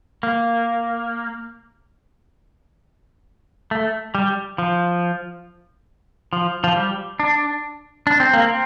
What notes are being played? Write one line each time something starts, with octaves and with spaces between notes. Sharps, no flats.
A#3
A3
G3
F3
F3
F3
G3
D4
D4
C4
A#3
C4